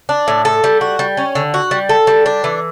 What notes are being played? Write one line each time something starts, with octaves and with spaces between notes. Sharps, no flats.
D4
A2
A4
G3
F#4
G3
C#4
D3
F#4
G3
A4
G3
D4
E3